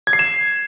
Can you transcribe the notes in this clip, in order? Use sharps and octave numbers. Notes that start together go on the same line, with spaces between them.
G#6
C7
E7